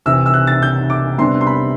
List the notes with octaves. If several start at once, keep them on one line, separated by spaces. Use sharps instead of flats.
C2 C3 E3 E6
E6
F#6
A6
G6
D6
C3 G3 B3 D4 C6
C6
B5